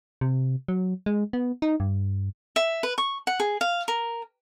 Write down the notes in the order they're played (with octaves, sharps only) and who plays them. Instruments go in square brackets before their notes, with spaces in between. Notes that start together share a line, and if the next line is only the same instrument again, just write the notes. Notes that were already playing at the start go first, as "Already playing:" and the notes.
[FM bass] C3
F#3
G#3
B3
D#4
G2
[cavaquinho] E5
B4
C#6
F#5
G#4
F5
A#4